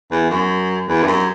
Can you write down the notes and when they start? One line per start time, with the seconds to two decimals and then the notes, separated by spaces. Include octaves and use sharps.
0.11 E2
0.30 F#2
0.88 E2
1.03 G2
1.07 F#2